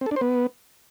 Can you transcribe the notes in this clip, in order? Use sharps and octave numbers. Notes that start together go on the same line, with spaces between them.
C4
A4
D4
C5
B3